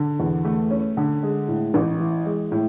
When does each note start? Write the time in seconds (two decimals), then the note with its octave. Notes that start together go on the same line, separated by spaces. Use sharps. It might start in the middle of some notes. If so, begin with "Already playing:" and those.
Already playing: D3
0.20 E2
0.45 A3
0.71 C#4
0.97 D3
1.23 G#3
1.48 A2
1.74 A1
2.00 E3
2.25 G#3
2.52 A2